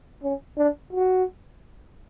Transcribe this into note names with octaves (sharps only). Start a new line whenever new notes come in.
C#4
D4
F#4